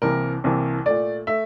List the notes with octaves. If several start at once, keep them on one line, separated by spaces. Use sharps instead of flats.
C2 C3 E3 A#3 A#4
C2 C3 E3 A#3
A#2 A3 D5
A3 E5